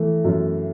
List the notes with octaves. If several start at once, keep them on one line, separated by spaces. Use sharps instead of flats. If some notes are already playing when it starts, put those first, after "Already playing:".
Already playing: E3 A3
F#2